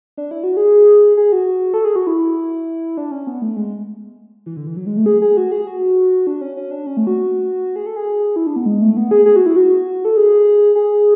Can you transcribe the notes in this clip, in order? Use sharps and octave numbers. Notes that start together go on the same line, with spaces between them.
D4
E4
F#4
G#4
G#4
F#4
A4
G#4
F#4
E4
D4
C#4
B3
A3
G#3
E3
D3
E3
F#3
G#3
A3
G#4
G#4
F#4
G#4
F#4
D4
C#4
C#4
D4
C#4
A3
F#4
G#4
A4
G#4
E4
D4
B3
G#3
A3
B3
G#4
G#4
F#4
E4
F#4
A4
G#4
G#4